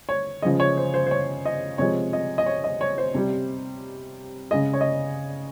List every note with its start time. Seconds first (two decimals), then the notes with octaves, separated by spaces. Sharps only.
0.09 C#5
0.42 C#3 F3 G#3 D#5
0.60 C#5
0.77 C5
0.94 C5
1.07 C5
1.11 C#5
1.46 D#5
1.78 C3 F3 G#3 C#5
2.13 D#5
2.38 D#5
2.46 C#5
2.64 D#5
2.81 C#5
2.98 C5
3.14 C3 G3
4.51 G#3 D#5
4.54 C#3
4.73 C#5
4.81 D#5